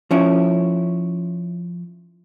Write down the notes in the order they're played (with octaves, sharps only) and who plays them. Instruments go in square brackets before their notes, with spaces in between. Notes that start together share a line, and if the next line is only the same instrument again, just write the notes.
[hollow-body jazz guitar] F3 C#4 E4